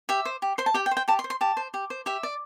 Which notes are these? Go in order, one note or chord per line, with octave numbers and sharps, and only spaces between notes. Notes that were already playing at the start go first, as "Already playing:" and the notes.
G4 E5
C5
G4
C5 C6
A5
G4 G5
G5
C5
G5
G4 A5
C6
C5
C6
G4 A5
C5
G4
C5
G4 E5
D5